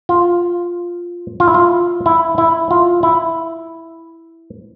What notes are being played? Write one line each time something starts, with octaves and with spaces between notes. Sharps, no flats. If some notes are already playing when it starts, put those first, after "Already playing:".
F4
F4
E4
F4
E4
E4
F4
E4